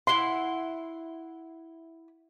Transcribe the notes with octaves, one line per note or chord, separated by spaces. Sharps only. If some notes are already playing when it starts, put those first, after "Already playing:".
E4 F#5 C6